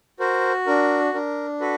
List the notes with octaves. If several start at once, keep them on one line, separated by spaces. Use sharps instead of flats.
F#4 A#4 C5
D4 A#4
D4 A#4
F#4 A4 B4